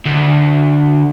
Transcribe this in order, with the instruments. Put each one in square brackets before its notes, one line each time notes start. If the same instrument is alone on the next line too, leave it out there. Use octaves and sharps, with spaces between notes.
[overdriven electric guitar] D2